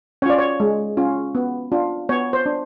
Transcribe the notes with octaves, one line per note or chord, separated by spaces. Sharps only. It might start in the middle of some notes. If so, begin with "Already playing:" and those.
C#4 F4 C#5 D5
C#5
G#3
C#4 F4
B3
D4 F4
B3 C#5
C5
D4